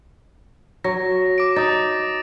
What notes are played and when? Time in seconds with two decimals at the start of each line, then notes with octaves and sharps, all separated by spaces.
0.84 F#3 A#6
1.38 D6 D7
1.56 D#4 D#6 A6